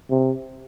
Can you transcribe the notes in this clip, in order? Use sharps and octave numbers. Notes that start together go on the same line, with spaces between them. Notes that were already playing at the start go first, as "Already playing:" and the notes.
C3